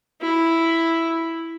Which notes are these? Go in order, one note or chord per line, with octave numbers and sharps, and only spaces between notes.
E4